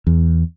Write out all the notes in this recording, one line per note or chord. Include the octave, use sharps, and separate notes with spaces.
E2